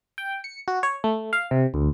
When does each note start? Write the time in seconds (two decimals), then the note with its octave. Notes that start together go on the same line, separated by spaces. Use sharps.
0.18 G5
0.44 C#7
0.68 F#4
0.83 C#5
1.04 A3
1.33 F5
1.51 C3
1.74 D2